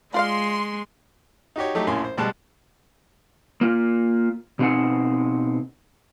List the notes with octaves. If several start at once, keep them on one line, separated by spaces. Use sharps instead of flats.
G#3 F4 D5 F5 C6
D#4 F#4 G4 C#5
F#3 A3 D#4 G4
A#1 F#2 A2 C#4 G#5 C6
C5
B2 G3 G#3 A5 F#6
A#3 F4
B2 A3 C4 D#4 F#5 G#5